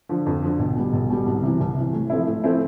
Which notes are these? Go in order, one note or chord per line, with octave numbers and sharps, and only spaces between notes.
D3 F3
F2
D3 F3
B1
B2 G3
B1
B2 G3
C2
C3 E3
C2
C3 E3
A2
F3 A3 C4 E4
A2
F3 A3 C4 E4